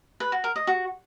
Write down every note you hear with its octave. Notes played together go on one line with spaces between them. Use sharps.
B4
F#4
A#4
D#5
F#4